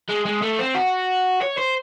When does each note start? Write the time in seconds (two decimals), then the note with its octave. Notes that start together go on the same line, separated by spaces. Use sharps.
0.09 G#3
0.25 G#3
0.42 A3
0.59 C4
0.75 F#4
1.41 C#5
1.58 C5